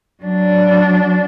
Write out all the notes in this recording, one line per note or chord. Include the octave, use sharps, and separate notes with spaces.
F#3 D4